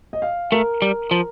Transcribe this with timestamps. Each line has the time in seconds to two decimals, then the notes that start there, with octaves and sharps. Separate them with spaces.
0.13 D#5
0.22 F5
0.52 A3 A#4
0.82 G3
1.11 F3